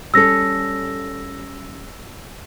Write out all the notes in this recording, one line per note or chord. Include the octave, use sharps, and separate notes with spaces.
G3 C#4 A4 E6 A#6